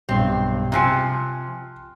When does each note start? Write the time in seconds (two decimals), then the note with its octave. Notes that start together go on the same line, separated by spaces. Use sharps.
0.09 B1 G2 C4
0.72 C3 F3 G#5 F6 F#6 C#7